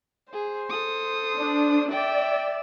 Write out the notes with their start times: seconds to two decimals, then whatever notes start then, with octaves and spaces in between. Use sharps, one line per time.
0.33 G#4 C5
0.70 A4 D#6
1.38 D4
1.92 D5 E5 G5